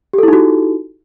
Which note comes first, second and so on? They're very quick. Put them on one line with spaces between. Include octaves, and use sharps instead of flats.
G4 A4 E4 D#4 F#4